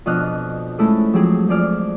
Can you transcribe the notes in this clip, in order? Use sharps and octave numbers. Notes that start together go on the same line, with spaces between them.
F2 B2 D4 D#5 F6 F#6
G#3 A3 C#4 E4 A4
F3 F#3 G#3 C4 G4 G#4
F2 F3 G#4 D5 F6